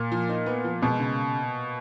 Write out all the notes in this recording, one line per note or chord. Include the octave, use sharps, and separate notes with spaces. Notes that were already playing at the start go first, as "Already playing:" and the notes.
Already playing: A#2
F3
D#4
B3
F3
B2 G#3
C#3